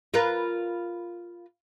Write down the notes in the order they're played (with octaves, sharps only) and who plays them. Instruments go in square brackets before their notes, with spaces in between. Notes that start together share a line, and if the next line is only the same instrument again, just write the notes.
[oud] F4 A#4 B4